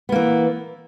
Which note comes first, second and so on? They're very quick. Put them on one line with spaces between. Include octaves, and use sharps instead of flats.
B3 A#3 E3